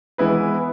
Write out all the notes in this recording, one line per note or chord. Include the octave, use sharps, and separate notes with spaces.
E3 G#3 B3 E4 B4